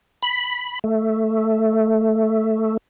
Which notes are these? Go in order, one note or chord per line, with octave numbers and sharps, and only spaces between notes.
B5
A3